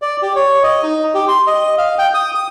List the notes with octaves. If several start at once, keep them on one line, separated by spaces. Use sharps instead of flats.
D5
G4
C#5
D#5
D#4
G4
C6
D#5
F5
G5
D#6
D#6